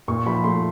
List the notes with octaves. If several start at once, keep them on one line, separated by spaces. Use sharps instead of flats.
A#2 C#6
F3 B5
A3 C6